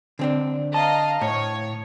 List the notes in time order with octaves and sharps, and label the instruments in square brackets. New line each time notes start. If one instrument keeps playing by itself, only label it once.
[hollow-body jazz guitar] D3 C4 D4
[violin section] D#5 F5 A#5 [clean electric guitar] A5
[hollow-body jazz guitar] A2 [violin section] C#5